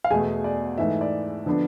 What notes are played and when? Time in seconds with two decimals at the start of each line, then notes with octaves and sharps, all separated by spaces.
0.04 F5
0.11 E2 B2 A3 G#4 G#5
0.44 D5
0.78 G#2 E3 A3 E5
1.01 D5
1.46 D3 F3 B3 D4